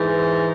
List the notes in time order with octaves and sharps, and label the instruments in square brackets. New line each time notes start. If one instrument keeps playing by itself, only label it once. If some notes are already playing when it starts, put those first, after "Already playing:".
Already playing: [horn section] G#2 E3